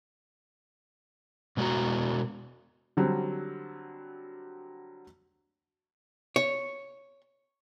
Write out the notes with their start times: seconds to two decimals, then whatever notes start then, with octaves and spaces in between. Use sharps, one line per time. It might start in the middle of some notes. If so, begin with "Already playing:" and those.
1.57 B2 G#3 B3 F#4 A#5
2.97 D3 F#3 G3 C4
6.36 C#5